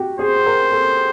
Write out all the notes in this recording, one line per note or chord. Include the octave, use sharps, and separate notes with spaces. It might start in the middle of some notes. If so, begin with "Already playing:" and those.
Already playing: F#4 G4
G#4 C5
A#4
A4